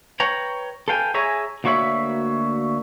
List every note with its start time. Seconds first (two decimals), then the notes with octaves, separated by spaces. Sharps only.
0.20 B4 C#5 G5 A#5
0.88 A4 B4 F5 G5 G#5
1.14 G#4 C#5 E5 G#5 A#5
1.64 D2 A#3 F#4 C#5 E5 B5